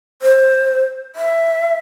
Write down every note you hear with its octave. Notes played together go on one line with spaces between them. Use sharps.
C5
E5